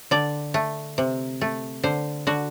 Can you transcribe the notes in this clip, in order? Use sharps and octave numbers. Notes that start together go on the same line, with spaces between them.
D3 D5
A3
C3
A3
D3 C5
D3 F#4